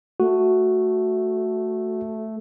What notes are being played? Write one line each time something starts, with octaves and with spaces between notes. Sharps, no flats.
A3 F#4